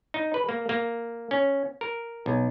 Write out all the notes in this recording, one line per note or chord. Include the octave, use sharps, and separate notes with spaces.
D#4
B4
A#3
A#3
C#4
A#4
B1